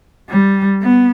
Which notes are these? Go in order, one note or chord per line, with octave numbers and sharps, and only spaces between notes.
G3
B3